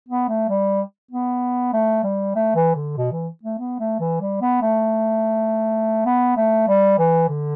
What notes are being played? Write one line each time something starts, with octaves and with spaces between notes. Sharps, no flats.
B3
A3
G3
B3
A3
G3
A3
E3
D3
B2
E3
A3
B3
A3
E3
G3
B3
A3
B3
A3
G3
E3
D3